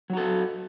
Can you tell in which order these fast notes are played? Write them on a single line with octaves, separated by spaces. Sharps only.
F#3 F#4 A4